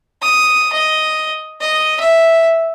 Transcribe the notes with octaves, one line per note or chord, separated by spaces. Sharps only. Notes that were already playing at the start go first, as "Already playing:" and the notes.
D#6
D#5
D#5
E5